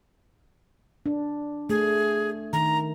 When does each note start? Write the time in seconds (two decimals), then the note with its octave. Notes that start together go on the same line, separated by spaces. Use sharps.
1.06 D4
1.69 A3 G#4
2.53 D#3 A#5